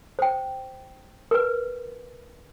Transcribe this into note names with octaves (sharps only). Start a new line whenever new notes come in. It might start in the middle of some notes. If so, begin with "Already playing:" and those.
C5 G5
A#4 B4